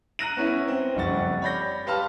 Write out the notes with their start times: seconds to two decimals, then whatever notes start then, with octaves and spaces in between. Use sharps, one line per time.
0.19 A#5 F#6 A#6 D#7
0.37 B3 C#4 E4 C#5
0.68 C4
0.95 F#1 F2 G3 F#5 C#6 A6
1.42 C#5 D5 B5 G6 A#6
1.86 G4 B4 F5 A5 C6 F6